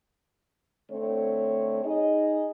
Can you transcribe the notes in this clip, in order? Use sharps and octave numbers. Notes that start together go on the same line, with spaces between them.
D3 A3 C4 C#5
D#4 G#4 D#5